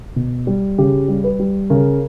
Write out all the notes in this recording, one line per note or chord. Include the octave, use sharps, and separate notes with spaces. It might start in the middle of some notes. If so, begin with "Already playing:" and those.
B2
G3
C#3 G4
G3
B4
G3
C#3 A#4